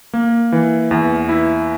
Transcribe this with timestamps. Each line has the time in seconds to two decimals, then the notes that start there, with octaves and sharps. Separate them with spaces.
0.13 A#3
0.52 E3
0.91 E2
1.29 E4